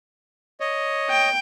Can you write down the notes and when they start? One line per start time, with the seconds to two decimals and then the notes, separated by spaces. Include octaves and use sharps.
0.60 C#5 D#5
1.10 G5